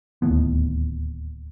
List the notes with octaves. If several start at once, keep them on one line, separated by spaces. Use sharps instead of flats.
D1 D#2 A2 B3